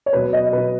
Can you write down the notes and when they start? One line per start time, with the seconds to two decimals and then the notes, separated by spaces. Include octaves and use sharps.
0.06 C#5
0.13 B2 F#3 B4
0.33 D#5
0.52 B2 F#3 B4